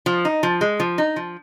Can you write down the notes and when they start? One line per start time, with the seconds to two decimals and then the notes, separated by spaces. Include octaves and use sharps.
0.06 F3
0.25 D#4
0.43 F3
0.61 G#3
0.80 F3
0.98 D#4
1.16 F3